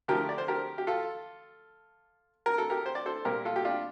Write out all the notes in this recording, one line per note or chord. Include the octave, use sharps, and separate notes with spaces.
D3 F3 A3 G4 A#4
D5
C5
G4 A#4
G4
F4 A4
A#4
A4
G4 A#4
C5
D5
A4 C5
A#2 G3 A#3 G4 A#4
F4 A4
G4
D4 F4